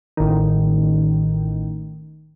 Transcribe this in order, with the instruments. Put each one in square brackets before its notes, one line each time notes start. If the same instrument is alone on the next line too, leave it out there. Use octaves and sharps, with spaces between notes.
[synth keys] A1 D#3